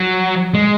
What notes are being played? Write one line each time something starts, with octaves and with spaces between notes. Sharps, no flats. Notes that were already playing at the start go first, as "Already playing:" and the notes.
Already playing: F#3
G#3